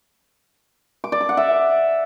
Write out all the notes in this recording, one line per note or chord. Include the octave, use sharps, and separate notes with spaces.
D6
D5
D6
F#5
E5